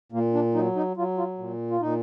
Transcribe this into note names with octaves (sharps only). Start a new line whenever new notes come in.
A#2 A#3
D4
F#3 D#4
D#4
F#3 F4
F4
A#2
F4
A#2 D#4